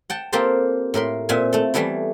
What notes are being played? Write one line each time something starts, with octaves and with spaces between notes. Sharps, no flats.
F#5 G5 A5
A#3 C4 F4 G4 A4 C5
A2 A#4 B5 C6
A#2 C4 E5 G#5
A3 A4
E3 G3 A3 B3 E4